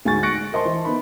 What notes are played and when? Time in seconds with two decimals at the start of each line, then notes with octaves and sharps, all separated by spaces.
0.05 D2 G#2 G#5 C#6 A6
0.23 C#6 F#6 A#6 C#7 D7
0.52 A#4 C5 D#5 A5 C6
0.65 E3
0.85 B3 D#4 B5